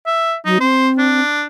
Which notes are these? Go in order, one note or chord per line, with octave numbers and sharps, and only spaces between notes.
E5
F#3 D#4
C4 C5
D4